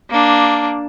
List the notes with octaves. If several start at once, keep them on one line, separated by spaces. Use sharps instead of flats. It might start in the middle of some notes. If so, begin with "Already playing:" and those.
A#3 D4